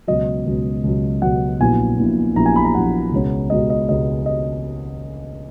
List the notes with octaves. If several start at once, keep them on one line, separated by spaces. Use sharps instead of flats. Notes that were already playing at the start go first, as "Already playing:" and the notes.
C#2 B2 F#3 D#5
C#2 B2 F#3
C#2 B2 F#3
C#2 B2 F#3 F#5
A#1 A#2 F#3 B3 E4 G#5
A#1 A#2 F#3 B3 E4
A#1 A#2 F#3 B3 E4 A#5
G#5
B5
A#5
A#1 A#2 F#3 B3 E4 F#5
C#2 B2 G#3 C#4
C#2 B2 G#3 C#4 D#5
D#5
C#2 B2 G#3 C#4 D#5
D#5